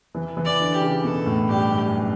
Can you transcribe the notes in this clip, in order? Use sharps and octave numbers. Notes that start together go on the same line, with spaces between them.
E3
E3
D5
D3
G4
C#3
B2 A4
A2
G2 G4
F#2